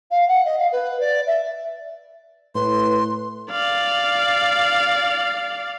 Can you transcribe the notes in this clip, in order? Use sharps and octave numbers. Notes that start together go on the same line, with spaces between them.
F5
F#5
D#5
F5
B4
D5
E5
A2 B4 C6
D5 F5